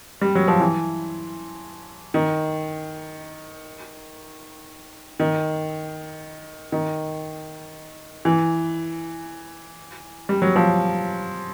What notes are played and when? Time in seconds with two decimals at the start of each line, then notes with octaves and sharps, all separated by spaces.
0.21 G3
0.35 F#3
0.48 F3
0.60 E3
2.14 D#3
5.20 D#3
6.72 D#3
8.25 E3
10.29 G3
10.42 F#3
10.56 F3